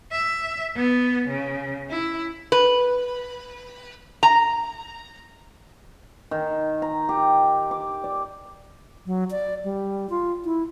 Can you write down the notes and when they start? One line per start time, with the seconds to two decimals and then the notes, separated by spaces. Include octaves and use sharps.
0.12 E5
0.76 B3
1.28 C#3
1.91 E4
2.52 B4
4.23 A#5
6.31 D#3
6.82 A#5
7.09 G4
7.71 D6
8.04 D5
9.05 F#3
9.31 D5
9.64 G3
10.10 F4
10.45 E4